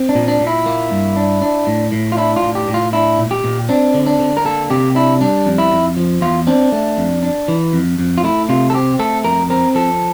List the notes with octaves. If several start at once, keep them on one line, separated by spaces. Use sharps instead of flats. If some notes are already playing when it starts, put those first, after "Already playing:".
Already playing: C4
D4
A#2
D4
A#2
E4
A#3
G2
D4
D4
A2
A2
F4
D4 E4
F4
A2
G4
A2
F4
D4 E4
A#2
G4
A#2
C4 D4
D3
D4
D3
A#4
A#3 A4
C3 G4
D4 E4
G3 D4
F2
E4
F2
F3
E2 F4
C4 D4
A3
F2
D4
E3
F2
F2
F4
A3 E4
C3 F4
A4
C4 G4
A3 A4
F2 A#4
C4 A#4
F3 A4